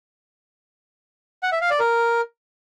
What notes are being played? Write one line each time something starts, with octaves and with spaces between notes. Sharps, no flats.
F#5
E5
F5
D5
A#4